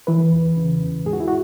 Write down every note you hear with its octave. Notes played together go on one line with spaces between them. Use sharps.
E3 B4
E2
C#3
E2
G#2 G#4
F#4
E4
F#4